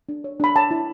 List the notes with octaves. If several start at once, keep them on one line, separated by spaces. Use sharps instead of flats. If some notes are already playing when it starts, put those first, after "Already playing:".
D4
C#5
D4 B5
C#5 A5
E4